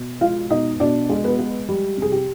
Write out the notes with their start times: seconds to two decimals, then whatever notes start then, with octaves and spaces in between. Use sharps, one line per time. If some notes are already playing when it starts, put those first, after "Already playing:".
Already playing: B2
0.21 G#3 F4 F5
0.50 B2 D#4 D#5
0.80 B2 D4 D5
1.09 G#3
1.24 B3 B4
1.39 G#3
1.69 G3
1.97 C3 G#4
2.12 G4